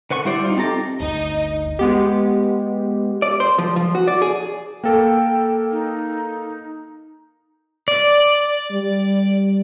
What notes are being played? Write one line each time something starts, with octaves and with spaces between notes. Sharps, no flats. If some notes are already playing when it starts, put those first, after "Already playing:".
D3 B4 F#5 C#6
G3 E4 C5 D5
D#4 F4
C4 G4 A4 A#5 D6
G1 D2 D#4 D#5
G#3 B3 G4
D5
C5
F3
F3
F#4
D5
G#4
A#3 A4 A#4 G5
D#4
D5
G3